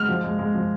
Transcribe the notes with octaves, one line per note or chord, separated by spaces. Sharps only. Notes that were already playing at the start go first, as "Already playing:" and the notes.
Already playing: G#3 F6
F3
G#3
G#3
F3